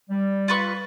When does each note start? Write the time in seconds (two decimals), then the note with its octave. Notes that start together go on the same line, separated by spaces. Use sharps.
0.10 G3
0.48 F4 B4 C#6